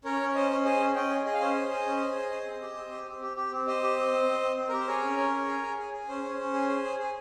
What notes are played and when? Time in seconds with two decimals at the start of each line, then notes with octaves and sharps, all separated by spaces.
0.04 C#4 A#4 C#5
0.20 C#4
0.29 C#5
0.35 C#4 C5 D#5
0.50 C#4
0.65 G#4 C5 D#5
0.80 C#4
0.95 C#4 D#5 G5
1.10 G#4
1.26 G#4 D#5
1.34 F5
1.40 C#4 C5 D#5
1.56 G#4
1.71 G#4
1.86 C#4
2.01 G#4
2.16 G#4
2.32 G#4
2.46 C4
2.61 G4
2.77 C4
2.92 G4
3.07 C4
3.22 G4
3.37 G4
3.52 C4
3.67 G4 C5 D#5
3.82 G4
3.97 C4
4.12 C4
4.28 C4
4.42 C4
4.57 C4
4.69 G4 A#4
4.79 C5
4.88 G#4 A#4 C#5
5.03 C#4
5.18 C#4
5.34 G#4
5.48 G#4
5.63 G#4
5.79 G#4
5.93 G#4
6.08 C#4 C5
6.24 C#4
6.39 C#4
6.54 G#4
6.69 G#4
6.84 G#4
6.99 G#4